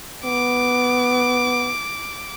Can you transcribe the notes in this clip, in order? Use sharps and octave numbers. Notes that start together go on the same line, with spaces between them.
B3 D6